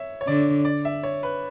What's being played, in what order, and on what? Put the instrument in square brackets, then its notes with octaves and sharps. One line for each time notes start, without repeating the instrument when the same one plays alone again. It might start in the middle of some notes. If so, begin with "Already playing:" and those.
Already playing: [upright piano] C#5 E5
C#5
[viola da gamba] D3 [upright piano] D5
[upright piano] D5
E5
C#5
B4